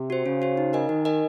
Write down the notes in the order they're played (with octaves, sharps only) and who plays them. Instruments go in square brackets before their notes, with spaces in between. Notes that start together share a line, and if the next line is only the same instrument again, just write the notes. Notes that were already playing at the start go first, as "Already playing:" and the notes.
Already playing: [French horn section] C3
[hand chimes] F#4 C5
[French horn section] C#3 [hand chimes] C#4
[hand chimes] F#4 C5
D#4
A#4 D#5 G#5
[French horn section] D#3 [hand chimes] D#4
[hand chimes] A#4 D#5 G#5